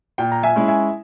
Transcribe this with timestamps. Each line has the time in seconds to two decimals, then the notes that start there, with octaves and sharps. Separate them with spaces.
0.18 A#2 G5
0.32 A#5
0.43 E5 G#5
0.56 G#3 C#4 E4
0.68 E5 G#5